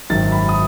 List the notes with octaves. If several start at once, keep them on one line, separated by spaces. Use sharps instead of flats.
G#1 F#2 D#3 A6
B5
D#6